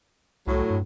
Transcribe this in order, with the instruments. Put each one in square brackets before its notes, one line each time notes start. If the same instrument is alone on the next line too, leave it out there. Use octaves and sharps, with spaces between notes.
[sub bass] C2 [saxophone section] A2 F#3
[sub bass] G2